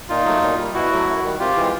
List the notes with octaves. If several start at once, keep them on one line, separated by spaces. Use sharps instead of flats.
A#2 D#4 F4
F#3 A3
A#2
G3
B2 E4 F#4
F#3 A3
F#2
D#3 G3
C3 F4 G4
E3 G#3